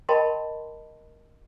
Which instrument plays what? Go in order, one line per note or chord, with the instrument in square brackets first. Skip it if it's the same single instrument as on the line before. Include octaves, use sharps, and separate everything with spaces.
[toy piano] A#4 D#5 G5 A5 B5 C6